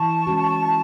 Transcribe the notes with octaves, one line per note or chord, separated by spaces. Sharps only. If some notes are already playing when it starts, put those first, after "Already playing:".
Already playing: E3 A5 C#6
G#3 C#4 F#4